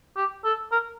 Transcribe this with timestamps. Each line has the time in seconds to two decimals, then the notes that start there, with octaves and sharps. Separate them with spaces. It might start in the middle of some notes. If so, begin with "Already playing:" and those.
0.16 G4
0.45 A4
0.72 A#4